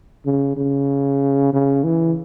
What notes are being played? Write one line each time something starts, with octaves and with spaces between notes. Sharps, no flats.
C#3
C#3
C#3
E3